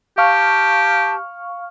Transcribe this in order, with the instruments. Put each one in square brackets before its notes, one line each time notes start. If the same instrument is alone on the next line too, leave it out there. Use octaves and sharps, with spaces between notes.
[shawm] G4 [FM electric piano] F5 C#6 F6 [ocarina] A5